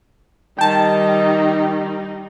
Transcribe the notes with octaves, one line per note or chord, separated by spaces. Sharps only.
D#3 G3 D#4 G5 A5